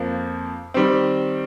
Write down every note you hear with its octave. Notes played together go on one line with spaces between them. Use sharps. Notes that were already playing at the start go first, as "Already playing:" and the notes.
Already playing: F2 F3 A#3
D#3 G3 C4